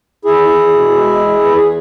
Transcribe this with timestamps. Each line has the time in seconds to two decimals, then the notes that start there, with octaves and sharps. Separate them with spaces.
0.25 E2 E4 G#4
0.49 E2
0.73 B2
0.96 G#3
1.20 E2
1.44 E2 B4
1.56 G#4